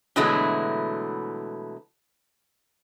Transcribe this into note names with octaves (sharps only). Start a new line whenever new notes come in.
B2 D3 E3 F#3 G#3 A3